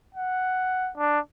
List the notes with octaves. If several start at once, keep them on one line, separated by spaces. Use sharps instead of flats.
F#5
D4